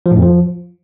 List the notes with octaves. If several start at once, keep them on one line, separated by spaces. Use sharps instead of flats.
F3
A2
F2
F3